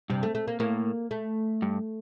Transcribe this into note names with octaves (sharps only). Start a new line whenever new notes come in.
G2 C3
A3
A3
A#3
A2 A#3
A3
G2